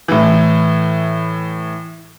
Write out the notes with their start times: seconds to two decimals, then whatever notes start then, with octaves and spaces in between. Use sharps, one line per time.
0.08 A2 E3